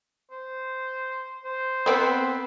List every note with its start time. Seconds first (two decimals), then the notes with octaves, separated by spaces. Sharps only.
0.31 C5
1.44 C5
1.86 B3 C4 B4